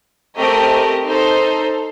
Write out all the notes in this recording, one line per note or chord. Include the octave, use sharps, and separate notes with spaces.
A3 C4 G4 A#4 D#5
D#4 A4 C5